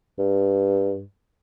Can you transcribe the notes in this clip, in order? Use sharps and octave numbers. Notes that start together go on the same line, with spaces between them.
G2